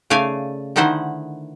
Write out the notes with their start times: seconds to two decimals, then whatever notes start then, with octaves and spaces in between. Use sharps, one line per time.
0.10 C#3 A3 D5 F5 G#5
0.76 D3 D#3 D#4 E4 C5 F#5